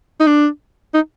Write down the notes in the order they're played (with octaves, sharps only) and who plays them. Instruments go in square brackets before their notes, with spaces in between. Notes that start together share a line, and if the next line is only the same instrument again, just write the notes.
[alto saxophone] D#4
D4
D#4